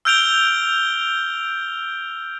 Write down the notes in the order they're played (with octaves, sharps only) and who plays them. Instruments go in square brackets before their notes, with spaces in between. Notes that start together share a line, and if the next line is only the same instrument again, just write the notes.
[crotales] E6 F6 G6 D7 F7 G7